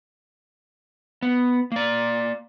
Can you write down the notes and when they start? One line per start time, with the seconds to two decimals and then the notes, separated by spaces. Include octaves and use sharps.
1.22 B3
1.72 A#3 D5